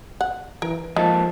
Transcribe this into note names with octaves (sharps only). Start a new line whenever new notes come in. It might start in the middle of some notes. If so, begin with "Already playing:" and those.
F#5
E3 A#4
F3 G#3 A#3 D#4 A5